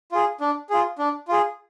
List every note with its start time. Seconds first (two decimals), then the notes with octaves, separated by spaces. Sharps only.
0.12 F4 G#4
0.41 D4
0.70 F4 G#4
0.99 D4
1.28 F4 G#4